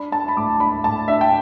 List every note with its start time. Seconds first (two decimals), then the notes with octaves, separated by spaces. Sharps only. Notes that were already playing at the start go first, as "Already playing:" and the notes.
Already playing: D4 B5
0.12 D4 A5
0.28 B5
0.37 A2 D6
0.60 D4 B5
0.84 A2 A5
1.08 D4 E5
1.21 G5